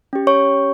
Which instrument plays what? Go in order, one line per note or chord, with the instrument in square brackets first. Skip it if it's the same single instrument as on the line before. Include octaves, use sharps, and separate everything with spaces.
[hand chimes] C#4 G4
C#5 C#6